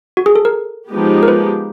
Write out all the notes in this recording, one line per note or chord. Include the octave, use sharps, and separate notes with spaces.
F#4
G#4
A4
A#4
F3 G#3 B3 D#4 G4
A#4
B4